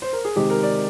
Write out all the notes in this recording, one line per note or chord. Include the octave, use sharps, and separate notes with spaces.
C5
A#4
G#4
C3 D#3 G#3 C4 G4
A#4
D5